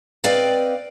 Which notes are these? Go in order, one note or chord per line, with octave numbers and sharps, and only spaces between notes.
C4 B4 D5 D#5 F5 G5